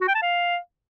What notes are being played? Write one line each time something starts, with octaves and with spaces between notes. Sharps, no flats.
F#4
G5
A5
F5